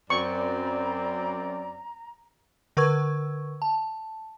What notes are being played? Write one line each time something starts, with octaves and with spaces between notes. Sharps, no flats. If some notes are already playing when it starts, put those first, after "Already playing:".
F#2 C4 D5 A#5 C#6
D3 A#4 B4 C#6 E6 G#6
A5